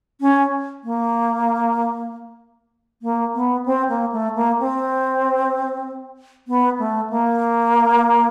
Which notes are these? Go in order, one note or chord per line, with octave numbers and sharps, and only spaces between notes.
C#4
A#3
A#3
B3
C4
A#3
A3
A#3
C4
B3
A3
A#3